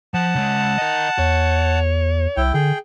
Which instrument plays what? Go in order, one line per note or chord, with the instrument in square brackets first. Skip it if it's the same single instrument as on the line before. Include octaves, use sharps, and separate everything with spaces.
[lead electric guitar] F3 [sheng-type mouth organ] F#5 A5
[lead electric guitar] C#3 G#3
A#4 D#5
[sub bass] E2 [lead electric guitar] C#5
[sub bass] C2 [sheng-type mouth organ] E4 G5
[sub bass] D3 [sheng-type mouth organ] G#4 G5